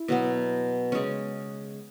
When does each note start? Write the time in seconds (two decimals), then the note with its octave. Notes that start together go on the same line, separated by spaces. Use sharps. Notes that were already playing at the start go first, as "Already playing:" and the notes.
Already playing: E4
0.08 B2 F#3 B3
0.92 C#3 G#3 C#4